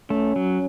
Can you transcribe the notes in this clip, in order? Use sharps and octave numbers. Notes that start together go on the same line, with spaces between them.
A3 C#4
F#3